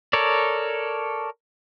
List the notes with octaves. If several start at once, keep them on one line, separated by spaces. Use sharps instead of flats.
A4 A#4 C#5 D5